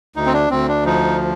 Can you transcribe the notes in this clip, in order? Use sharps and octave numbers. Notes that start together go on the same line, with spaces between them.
D2 D#4
C4
D4
D2 C4
D4
F3 D#4